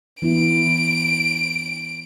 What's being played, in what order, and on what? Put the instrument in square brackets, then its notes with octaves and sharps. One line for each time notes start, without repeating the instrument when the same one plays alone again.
[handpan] E3 B3 E4 [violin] D7